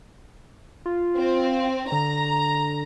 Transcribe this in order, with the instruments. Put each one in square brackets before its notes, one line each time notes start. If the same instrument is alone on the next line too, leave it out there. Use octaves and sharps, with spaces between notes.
[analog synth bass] F4
[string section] C4
[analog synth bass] D3 [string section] A#5